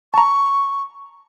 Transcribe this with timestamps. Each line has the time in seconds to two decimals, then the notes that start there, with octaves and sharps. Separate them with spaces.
0.14 A5 A#5 C#6